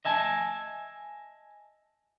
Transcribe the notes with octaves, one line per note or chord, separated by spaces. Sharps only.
D#5 E5 G#5 A5